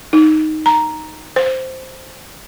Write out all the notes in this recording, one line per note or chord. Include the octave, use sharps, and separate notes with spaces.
D#4
A#5
C5